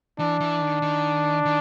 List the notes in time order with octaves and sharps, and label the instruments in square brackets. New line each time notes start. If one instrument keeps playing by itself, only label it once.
[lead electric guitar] E3 [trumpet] D4
[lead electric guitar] E3
D#3
D#3
D#3